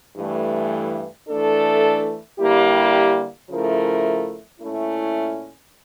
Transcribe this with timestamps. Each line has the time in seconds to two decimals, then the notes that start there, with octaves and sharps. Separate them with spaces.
0.17 G2 E3 A3
1.27 E3 A3 D4 A4
2.39 D3 G3 A#3 E4 G4
3.50 C#3 F3 A3 E4 A#4
4.61 A#2 A3 C#4 E4